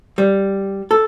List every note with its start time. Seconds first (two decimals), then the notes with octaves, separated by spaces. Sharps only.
0.18 G3
0.91 A4